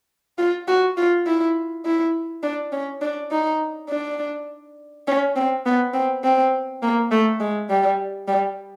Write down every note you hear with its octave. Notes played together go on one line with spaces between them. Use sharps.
F4
F#4
F4
E4
E4
D4
C#4
D4
D#4
D4
C#4
C4
B3
C4
C4
A#3
A3
G#3
G3
G3